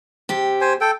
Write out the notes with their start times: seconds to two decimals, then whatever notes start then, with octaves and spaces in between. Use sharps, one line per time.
0.29 C3 G4
0.61 C5 G#5
0.81 A4 G5